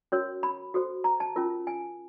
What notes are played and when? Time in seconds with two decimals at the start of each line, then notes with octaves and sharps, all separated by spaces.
0.12 C#4 F#4 A#4 C#5
0.43 B5
0.74 F#4 A4 C5
1.04 A#5
1.20 A5
1.36 C#4 F4 A#4
1.67 G#5